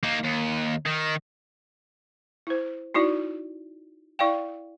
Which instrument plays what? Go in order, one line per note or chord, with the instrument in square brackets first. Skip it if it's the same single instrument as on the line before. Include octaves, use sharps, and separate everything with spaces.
[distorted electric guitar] A#3 D#4
D#2
D#3
[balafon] E4 C5
D#4 E4 F#4 D5
E4 D5 F5 G5